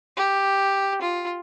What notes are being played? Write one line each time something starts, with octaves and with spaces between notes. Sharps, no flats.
G4
F4